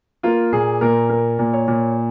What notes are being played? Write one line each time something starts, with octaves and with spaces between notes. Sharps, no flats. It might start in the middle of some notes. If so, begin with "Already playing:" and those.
A#3 F4
A#2 G#4
A#2 A#4
A#3 A#4
A#2
C#5
A#2